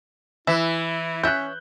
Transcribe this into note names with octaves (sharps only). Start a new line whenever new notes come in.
E3 E4 E5
C#4 C#5 E5 F#6 G6